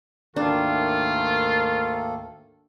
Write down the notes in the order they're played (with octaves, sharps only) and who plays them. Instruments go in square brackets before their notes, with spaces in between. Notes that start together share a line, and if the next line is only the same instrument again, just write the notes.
[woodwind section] D2 G#2 D#3 [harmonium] A#3 A4 [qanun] D4 [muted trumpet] F4